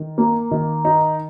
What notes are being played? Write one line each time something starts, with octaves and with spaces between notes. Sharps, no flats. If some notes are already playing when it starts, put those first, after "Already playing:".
Already playing: D#3
A#3
D#3
D#4